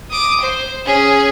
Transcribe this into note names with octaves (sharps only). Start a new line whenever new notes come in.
D6 D#6
C5
C#4 G#4